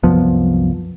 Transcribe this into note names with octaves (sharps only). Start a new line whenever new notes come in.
C2 F#2 F3 B3